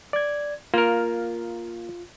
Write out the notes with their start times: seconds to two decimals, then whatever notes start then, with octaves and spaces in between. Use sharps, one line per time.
0.13 D5 G#6
0.74 A#3 F4 A#4